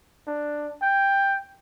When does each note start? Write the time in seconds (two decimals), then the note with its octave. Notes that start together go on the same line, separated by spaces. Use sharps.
0.27 D4
0.82 G5